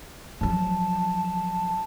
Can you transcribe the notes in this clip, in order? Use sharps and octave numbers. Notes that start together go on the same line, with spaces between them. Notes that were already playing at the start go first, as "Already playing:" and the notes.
F3 F#3 A5